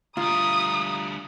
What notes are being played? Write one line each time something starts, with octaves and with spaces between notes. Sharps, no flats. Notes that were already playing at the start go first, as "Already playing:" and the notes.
D2 G3 F4 A#5 D#6